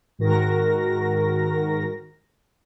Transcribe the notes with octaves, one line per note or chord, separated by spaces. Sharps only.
G#2 D#3 F#4 A#4 A#6